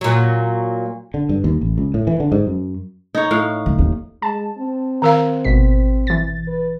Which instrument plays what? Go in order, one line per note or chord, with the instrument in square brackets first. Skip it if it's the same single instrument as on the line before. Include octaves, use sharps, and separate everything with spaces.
[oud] A#2 F#3
[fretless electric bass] D3
G2
D#2
A1
C#2
A2
E3
D3
G#2
F#2
[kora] D#4 C#5
A2 F5
[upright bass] D2
D#2
[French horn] G#3 [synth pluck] A5
[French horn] C4
[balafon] D#3 A#4 F5
[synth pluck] G#1 B2 B6
E3 A6
[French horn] B4